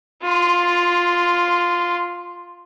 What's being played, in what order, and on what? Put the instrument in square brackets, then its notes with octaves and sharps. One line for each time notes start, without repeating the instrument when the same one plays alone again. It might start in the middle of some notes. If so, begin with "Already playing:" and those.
[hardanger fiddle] F4 C6